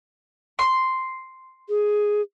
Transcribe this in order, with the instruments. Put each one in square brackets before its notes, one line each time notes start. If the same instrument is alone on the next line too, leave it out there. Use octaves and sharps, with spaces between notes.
[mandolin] C6
[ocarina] G#4